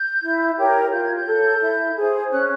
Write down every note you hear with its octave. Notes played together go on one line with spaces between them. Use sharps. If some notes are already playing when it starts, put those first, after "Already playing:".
Already playing: G6
E4
G4 A#4 C#5
F4 G6
G#6
G6
A4 C#5
E4
G#4 C5
C#4 F#6